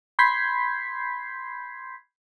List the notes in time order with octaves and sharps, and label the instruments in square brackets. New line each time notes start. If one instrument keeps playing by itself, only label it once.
[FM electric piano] B5 C6 G6 G#6 B6 C7